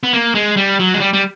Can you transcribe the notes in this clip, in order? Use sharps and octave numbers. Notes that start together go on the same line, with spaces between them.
B3
A#3
G#3
G3
F#3
G#3
G3
G3